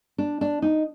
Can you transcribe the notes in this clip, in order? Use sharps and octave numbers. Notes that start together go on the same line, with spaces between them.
D4
D4
D#4